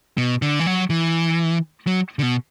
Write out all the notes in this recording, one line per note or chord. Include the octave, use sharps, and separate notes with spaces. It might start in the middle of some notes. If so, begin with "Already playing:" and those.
B2
D3
E3
F#3
E3
F#3
D3
B2